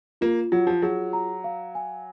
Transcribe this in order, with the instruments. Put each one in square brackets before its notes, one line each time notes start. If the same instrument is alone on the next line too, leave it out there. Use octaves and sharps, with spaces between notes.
[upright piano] A#3 [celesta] F4
[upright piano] F#3 [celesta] F4
[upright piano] F3
[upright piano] F#3 [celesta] G#4
[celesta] A#5
F5
G#5